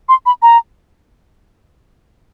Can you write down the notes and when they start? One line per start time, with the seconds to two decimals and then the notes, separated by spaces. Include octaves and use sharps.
0.09 C6
0.26 B5
0.42 A#5